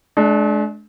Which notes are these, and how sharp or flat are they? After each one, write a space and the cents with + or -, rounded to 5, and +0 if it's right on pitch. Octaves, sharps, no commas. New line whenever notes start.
G#3 +45 D4 +0